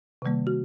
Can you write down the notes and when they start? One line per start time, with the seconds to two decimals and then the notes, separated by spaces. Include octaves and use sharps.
0.22 C3 D#3 G3 A#3
0.47 F#4